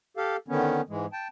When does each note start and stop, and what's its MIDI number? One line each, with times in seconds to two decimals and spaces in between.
0.17 0.36 67
0.17 0.36 69
0.17 0.36 77
0.48 0.81 50
0.48 0.81 51
0.48 0.81 59
0.48 0.81 61
0.89 1.06 44
0.89 1.06 52
0.89 1.06 56
1.13 1.28 79
1.13 1.28 81